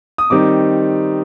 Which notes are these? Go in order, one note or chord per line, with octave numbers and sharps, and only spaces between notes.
D#6
D#3 G3 C4 D#4 D6